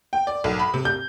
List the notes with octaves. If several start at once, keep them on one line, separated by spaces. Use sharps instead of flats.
G5
D5
B1
B5
C3
G6